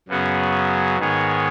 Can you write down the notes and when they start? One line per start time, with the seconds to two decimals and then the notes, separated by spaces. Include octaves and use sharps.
0.08 F#2 C#3 F#3 B3 G#4
0.98 G#2 D#3 B3 G#4 C#5